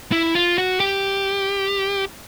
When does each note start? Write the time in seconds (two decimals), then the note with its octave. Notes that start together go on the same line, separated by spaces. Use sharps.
0.12 E4
0.35 F4
0.58 F#4
0.80 G4